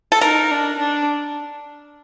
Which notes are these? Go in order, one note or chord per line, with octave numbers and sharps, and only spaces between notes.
A4
D#4 A#4
D4
D4